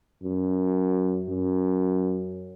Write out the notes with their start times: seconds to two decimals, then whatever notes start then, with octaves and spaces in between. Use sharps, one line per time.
0.23 F#2
1.29 F#2